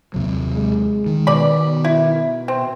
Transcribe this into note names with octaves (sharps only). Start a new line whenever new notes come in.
D#2 C3 F#3
G#3
D#3
B2 D5 B5
E4
C4